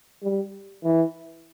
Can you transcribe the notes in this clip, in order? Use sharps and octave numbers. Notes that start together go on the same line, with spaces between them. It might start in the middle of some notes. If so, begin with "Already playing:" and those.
G3
E3